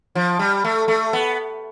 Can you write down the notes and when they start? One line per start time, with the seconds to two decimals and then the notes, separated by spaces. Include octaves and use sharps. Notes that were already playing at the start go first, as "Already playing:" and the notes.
0.15 F3
0.39 G3
0.64 A3
0.88 A3
1.13 B3